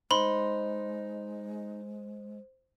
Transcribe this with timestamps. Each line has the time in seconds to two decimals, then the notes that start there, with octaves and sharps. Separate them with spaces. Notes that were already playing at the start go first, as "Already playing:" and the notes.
0.11 G#3 D#4 C5 B5 C6